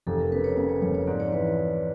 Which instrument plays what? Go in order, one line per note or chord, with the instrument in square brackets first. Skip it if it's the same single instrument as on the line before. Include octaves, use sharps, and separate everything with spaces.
[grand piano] F1 [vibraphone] A4
[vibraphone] A#4
[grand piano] C#3 [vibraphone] B4
[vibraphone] C#5
[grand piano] C#3 [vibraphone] C#5
[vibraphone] C#5
[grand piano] F2 [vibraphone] C#5
[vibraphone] C#5
[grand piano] G#2 [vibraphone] D5
[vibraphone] C#5
[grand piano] E3 [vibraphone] B4